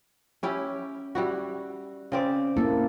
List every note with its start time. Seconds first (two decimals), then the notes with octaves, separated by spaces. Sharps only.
0.43 C#4 E4 G4
1.15 G3 E4 F#4
2.12 C#3 C4 D5
2.56 A#3 E4 A4